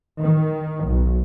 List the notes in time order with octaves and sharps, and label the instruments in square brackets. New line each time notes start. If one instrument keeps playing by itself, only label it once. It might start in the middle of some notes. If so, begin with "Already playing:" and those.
[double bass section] D#3
B1